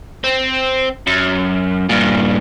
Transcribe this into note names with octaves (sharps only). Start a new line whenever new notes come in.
C4
F#2
G2 A#2